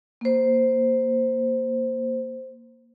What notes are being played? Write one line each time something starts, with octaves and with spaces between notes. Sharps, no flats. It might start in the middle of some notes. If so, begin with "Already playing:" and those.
A#3 C5